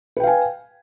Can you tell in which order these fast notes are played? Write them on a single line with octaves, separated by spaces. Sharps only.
B4 G5 F5 G#5